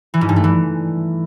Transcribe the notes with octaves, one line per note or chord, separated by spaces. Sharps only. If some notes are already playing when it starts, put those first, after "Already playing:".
E3
G#2
G2
A3
E3